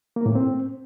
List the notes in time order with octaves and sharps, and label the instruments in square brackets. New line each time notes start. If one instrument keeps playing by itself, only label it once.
[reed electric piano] A#3
A2
C4